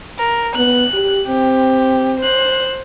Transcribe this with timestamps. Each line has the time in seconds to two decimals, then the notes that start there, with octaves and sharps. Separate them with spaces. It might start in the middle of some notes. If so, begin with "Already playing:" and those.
0.18 A#4
0.56 B3 F#6
0.93 G4
1.27 C4 G4
2.20 C5 F#6